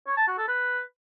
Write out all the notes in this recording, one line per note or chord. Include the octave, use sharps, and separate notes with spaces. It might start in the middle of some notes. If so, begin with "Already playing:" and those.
C#5
A5
F#4
A4
B4